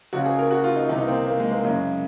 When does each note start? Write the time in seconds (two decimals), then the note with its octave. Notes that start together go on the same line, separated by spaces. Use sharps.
0.13 C#2 C#3 F#4
0.26 G#4
0.39 A#4
0.51 F#4
0.64 F4
0.76 D#4
0.89 C2 C3 D#3 D#4
1.04 A#3
1.08 C4
1.27 A#3
1.40 G#3
1.51 A#3
1.64 F#2 C#3 G#3